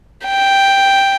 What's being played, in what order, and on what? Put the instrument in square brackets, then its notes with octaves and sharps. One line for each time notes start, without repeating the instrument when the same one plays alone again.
[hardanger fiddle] G5